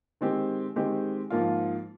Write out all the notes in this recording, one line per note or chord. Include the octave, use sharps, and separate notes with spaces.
D#3 G#3 C4 G4
D#3 G#3 C4 G4
G#2 F3 A#3 F4